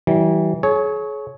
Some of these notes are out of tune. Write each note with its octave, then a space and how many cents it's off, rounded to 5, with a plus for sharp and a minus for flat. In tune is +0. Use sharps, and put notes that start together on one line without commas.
E3 -20 G3 -40
G#4 +40 C#5 +0